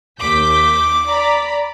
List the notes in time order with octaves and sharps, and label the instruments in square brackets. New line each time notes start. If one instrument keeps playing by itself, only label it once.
[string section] D#2 G6 B6 [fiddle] D6
[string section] D5 A#5 B5